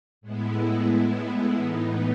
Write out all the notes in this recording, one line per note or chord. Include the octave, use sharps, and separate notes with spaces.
A2 G#3 B3 E4
A2 E3 B3 D#4